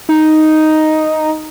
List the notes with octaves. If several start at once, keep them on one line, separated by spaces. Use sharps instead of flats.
D#4